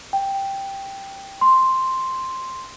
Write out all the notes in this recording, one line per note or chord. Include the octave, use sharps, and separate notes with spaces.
G5
C6